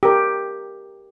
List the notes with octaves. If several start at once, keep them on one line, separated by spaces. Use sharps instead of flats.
G4 A#4